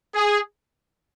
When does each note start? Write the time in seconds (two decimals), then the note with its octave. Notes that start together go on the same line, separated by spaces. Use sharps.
0.14 G#4